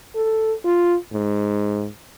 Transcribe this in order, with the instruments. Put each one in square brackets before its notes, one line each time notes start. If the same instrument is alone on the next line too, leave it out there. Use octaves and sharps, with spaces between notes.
[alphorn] A4
F4
G#2